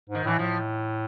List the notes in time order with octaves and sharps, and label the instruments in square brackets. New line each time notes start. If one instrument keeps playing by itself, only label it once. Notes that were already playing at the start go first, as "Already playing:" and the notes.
[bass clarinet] G#2
[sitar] D#3
[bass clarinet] A2 [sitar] E3
[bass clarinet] A2 [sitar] F3